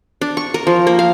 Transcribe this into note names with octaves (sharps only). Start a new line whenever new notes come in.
D4
C#6
A#4
F3
A#3
F5